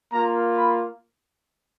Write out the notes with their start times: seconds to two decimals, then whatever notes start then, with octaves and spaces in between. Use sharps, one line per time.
0.13 A#3 F4 A#5
0.58 B5